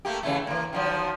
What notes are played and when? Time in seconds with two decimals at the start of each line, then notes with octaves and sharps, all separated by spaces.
0.05 A3 A#3 G4
0.23 C#3 E3 A3
0.47 E3 A#3
0.73 D#3 F3 F#3